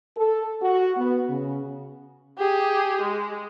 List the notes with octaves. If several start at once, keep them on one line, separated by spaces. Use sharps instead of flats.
A4
F#4
B3
C#3
G4 G#4
G#3